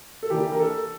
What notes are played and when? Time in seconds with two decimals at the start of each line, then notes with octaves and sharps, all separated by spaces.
0.23 A4
0.30 E3 A#3 D4 G4
0.52 A#4
0.60 A4